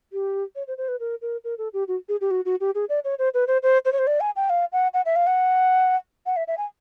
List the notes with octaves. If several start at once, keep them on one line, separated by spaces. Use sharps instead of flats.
G4
C#5
C5
C5
B4
A#4
A#4
A#4
A4
G4
F#4
G#4
G4
F#4
F#4
G4
G#4
D5
C#5
C5
B4
C5
C5
C5
C#5
C5
D5
G#5
G5
F5
F#5
F#5
E5
F5
F#5
F#5
E5
E5
G#5